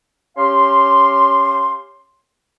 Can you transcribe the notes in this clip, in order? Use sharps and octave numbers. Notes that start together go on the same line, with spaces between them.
C#4 G4 F5 C6